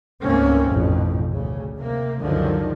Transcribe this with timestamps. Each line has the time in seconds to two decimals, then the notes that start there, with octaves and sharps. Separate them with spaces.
0.24 C#2 G#2 A3 A#3 C4 C#4
0.68 A1 F2 G#2 B2
1.32 D2 C#3
1.77 C3 A#3
2.22 C#2 F#2 D3 D#3 F3